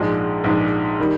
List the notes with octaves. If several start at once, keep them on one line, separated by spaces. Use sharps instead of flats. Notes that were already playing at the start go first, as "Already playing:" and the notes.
Already playing: A#1 G#2 F3 G#3 D4
A#1 G#2 F3 G#3 D4
D#3 G3